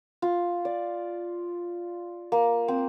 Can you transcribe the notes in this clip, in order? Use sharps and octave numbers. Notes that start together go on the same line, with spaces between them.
F4
D5
A#3
C4